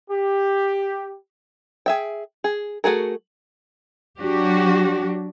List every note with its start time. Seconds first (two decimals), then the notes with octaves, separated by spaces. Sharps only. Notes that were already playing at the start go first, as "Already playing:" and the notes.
0.10 G4
1.86 G#4 E5 G5
2.44 G#4
2.84 A3 F#4 G#4 A#4
4.19 F#3 D4 F#4 G4